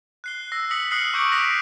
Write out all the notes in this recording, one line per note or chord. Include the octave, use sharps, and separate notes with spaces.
F#6 C7 G7
E6 A#6 C7
D#6 B6 C#7 F#7
D#6 F6 F#6 C7 C#7 F#7
C#6 D6 G6 C#7 D7 F#7
F#6 A#6 B6 D7 F7